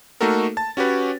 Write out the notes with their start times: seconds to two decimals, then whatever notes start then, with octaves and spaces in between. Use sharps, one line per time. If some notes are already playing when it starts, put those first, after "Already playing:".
0.21 A3 A#3 D#4 F#4 A4 A#4
0.57 A5 A6
0.77 C#4 F#4 G4 B4 C#5